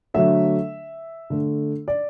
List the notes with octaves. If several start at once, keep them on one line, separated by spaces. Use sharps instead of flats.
D3 F#3 A3 E5
D3 A3
D5